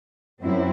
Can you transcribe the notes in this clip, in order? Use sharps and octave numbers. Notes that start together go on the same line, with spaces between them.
F#2 F#3 C4 E4